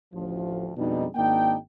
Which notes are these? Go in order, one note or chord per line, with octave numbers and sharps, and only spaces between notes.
A1 D2 F3
F2 B2 G3 G#3 D4 D#4
G#1 A#3 D4 D#4 G5